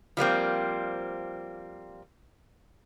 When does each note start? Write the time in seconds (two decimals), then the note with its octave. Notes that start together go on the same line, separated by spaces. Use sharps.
0.17 F3 G3 A#3 C4